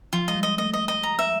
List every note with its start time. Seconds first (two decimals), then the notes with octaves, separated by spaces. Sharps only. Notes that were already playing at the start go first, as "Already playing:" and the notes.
0.13 F3 F4
0.28 G#3 D#5
0.35 G3
0.43 D#5
0.58 A3 D#5
0.73 D#5
0.88 D#5
1.03 A#5
1.19 E5